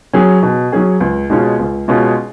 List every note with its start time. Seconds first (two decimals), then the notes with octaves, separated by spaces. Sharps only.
0.13 F#3 C#4 G#4
0.43 B2
0.72 F#3 C#4 G#4
1.01 C#2
1.30 B2 G#3 C#4 F4
1.59 C#2
1.88 B2 G#3 C#4 F4